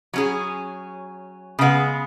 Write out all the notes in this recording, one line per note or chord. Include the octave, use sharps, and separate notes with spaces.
F#3 C#4 G#4
C#3 G#3 B3